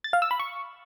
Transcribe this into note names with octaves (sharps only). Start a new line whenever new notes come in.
A6
F5
E6
B5
C#6